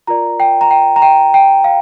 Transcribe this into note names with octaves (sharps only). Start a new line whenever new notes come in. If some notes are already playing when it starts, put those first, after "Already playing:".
F4 A#4 D5 A#5
G5
A#5
G5
A#5
G5
G5
F5